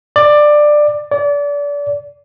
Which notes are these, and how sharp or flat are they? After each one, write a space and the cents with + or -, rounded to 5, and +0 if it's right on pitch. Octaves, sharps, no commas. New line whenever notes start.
D5 +15
D5 -30